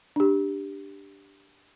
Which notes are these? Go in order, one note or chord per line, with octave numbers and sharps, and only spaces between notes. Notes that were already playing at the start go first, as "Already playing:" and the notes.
D4 G4